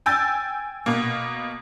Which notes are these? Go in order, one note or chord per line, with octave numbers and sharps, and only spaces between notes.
G5 G#5 E6 G6 A6
B2 A#3